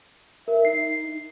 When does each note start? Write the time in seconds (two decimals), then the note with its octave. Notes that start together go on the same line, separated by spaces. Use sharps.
0.48 A#4 E5
0.65 D#4 C7